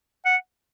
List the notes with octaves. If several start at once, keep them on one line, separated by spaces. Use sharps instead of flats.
F#5